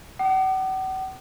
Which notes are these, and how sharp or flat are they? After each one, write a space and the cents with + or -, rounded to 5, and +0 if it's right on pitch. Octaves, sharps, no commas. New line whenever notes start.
F#5 +40 D6 +40